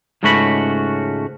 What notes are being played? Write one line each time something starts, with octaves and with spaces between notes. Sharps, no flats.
C#2 G#2 A3 C#4 F#4 B5